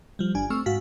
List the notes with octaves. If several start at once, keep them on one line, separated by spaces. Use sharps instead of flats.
F3 G3
G1 D4 G#5
A3 C4 C#6 E6 F6
G#2 F#4 F5 B6